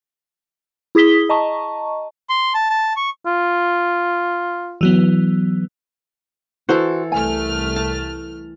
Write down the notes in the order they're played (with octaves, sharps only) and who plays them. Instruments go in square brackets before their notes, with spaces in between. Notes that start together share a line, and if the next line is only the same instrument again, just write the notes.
[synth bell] E4 G#4 D#6 B6 G7
D#5 A5 A#5 C#6
[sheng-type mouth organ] C6
A5
A5
C#6
[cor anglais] F4
[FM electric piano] E3 F#3 B3
[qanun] E3 A4 [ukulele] F#4 C5
[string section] C2 A3 F6 [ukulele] G#5
[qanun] A5